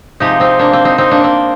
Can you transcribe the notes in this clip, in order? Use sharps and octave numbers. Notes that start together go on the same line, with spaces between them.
C3 F3 G#3 D#4 G4
C4 D#4
A#3 D4
C4
C4 D#4
C4 D#4
A#3 D4
C4